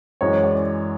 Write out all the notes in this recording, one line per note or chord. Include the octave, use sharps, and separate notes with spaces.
F#2 E3 G#3 C#5
D5